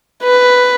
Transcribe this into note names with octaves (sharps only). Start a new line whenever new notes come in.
B4